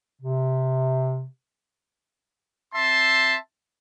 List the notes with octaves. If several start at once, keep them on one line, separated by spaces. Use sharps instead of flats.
C3
C4 E5 A5 C6